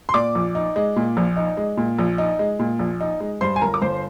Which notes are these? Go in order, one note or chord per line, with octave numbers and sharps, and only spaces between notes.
C6
A#2 D5 D6
A#1
D#4
G#3
A#2
A#1
D#4
G#3
A#2
A#1
D#4
G#3
A#2
A#1
D#4
G#3
G2 C5 C6
G#5
G1 A#4 A#5
D6
G1 C5 C6